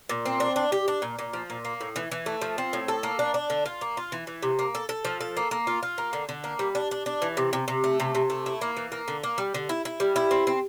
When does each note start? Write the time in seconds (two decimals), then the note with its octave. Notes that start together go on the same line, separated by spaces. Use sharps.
0.09 A#2
0.25 C4
0.40 D4
0.56 D4
0.72 G4
0.88 D4
1.02 A#2
1.19 A#2
1.33 F3
1.50 A#2
1.65 A#3
1.81 A2
1.96 E3
2.11 E3
2.26 A3
2.41 F3
2.58 C4
2.73 A2
2.88 A4
3.03 A#3
3.19 D4
3.34 D4
3.50 D3
3.66 F4
3.81 A#3
3.97 F4
4.12 E3
4.27 E3
4.42 C3
4.59 A#3
4.75 A4
4.89 A4
5.05 F3
5.21 A4
5.37 A#3
5.51 A#3
5.67 F4
5.83 F4
5.98 A#3
6.13 D3
6.29 D3
6.44 A#3
6.59 G3
6.75 D4
6.91 D4
7.06 D4
7.22 E3
7.37 C3
7.53 C3
7.68 C3
7.84 A3
8.00 C3
8.15 C3
8.30 A3
8.46 E4
8.61 A#3
8.77 E3
8.92 A#3
9.08 D3
9.24 A#3
9.38 G3
9.54 D3
9.69 E4
9.85 E4
10.00 G3
10.16 E4
10.31 C4
10.47 C4